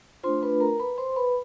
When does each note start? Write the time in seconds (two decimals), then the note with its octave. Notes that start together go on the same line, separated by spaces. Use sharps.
0.23 A3 D4 F4 C5 C6
0.43 B4 B5
0.60 A#4 A#5
0.79 B4 B5
0.98 C5 C6
1.16 B4 B5